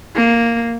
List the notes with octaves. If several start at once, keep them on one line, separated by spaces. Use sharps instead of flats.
A#3